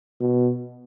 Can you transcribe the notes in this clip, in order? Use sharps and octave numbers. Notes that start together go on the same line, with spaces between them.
B2